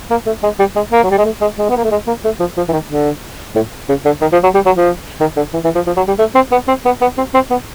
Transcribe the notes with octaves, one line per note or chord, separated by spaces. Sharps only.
A#3
A3
G#3
G3
G#3
A#3
F#3
G3
G#3
A3
G#3
G#3
B3
A#3
A3
G#3
A#3
A3
F3
F3
E3
D#3
D3
A2
C#3
D3
D#3
F3
F#3
G3
F#3
F3
D#3
D3
E3
E3
F3
F3
F#3
G3
A3
C4
B3
C4
B3
B3
C4
C4
B3